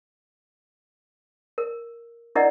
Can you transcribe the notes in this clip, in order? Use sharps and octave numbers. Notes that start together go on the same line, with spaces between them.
A#4
D4 E4 A#4 D5 D#5 F#5